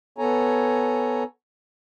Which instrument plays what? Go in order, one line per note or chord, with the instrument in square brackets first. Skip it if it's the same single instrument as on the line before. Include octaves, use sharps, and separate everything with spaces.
[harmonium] B3 A4 C#5 G#5 A#5